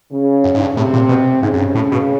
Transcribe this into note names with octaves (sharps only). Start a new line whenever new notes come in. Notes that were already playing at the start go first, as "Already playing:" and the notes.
C#3
F#2
G#2
G2
A2 C3
A#2
B2
G#2 C#3
F#2
G2
A2 C#3
B2